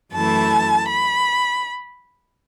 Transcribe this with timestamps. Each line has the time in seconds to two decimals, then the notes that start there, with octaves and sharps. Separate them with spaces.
0.12 F#2 E3 A3 E4 A5
0.88 B5